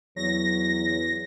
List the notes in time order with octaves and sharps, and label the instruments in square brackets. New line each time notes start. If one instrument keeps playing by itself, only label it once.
[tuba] E2 [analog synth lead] F#3 [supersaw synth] A#6